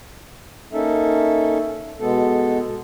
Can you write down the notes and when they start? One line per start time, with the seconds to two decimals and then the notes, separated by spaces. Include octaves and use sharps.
0.73 A#3 C#4 D#4 A4 E5
2.00 B2 G#3 B3 A4